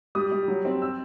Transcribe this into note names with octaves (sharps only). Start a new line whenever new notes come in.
G3 D#6
G3
F#3
C4
E6